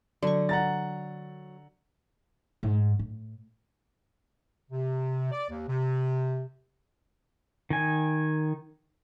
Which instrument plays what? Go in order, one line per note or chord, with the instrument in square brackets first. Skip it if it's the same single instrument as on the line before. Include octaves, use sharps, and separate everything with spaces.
[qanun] D3 C#6 [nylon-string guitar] F#3
[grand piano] F#5 A#5 A6
[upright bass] G#2
A2
[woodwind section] C3
D5
D#2
C3
[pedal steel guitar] D#3 G#5